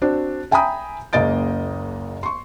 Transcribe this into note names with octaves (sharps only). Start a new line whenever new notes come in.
C4 D4 F#4
E5 G5 G#5 A#5 B5 D#6
F#1 C#2 A#3 D#5 A6 D7
C6 C#6